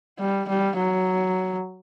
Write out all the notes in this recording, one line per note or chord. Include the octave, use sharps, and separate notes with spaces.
G3
G3
F#3